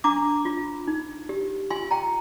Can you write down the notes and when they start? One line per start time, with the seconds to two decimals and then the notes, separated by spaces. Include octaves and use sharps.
0.04 D4 A#5 D6
0.45 F4
0.88 D#4
1.29 G4
1.70 F4 G#5 C6
1.91 G5 A#5